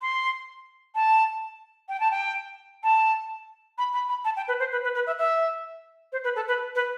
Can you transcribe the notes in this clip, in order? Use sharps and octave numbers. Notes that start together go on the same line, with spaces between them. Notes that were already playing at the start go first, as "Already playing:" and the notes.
C6
A5
G5
A5
G5
A5
B5
B5
B5
A5
G5
B4
C5
B4
B4
B4
E5
E5
C5
B4
A4
B4
B4